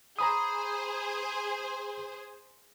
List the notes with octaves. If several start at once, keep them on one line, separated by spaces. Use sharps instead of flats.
G#4 C5 A#5 B5 D#6